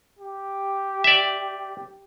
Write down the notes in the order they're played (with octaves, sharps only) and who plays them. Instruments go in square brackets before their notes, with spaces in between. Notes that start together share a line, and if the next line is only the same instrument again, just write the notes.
[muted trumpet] G4
[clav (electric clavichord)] D5 E5